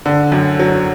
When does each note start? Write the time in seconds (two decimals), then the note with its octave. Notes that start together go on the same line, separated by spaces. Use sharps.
0.06 D3
0.32 F#2
0.59 F#3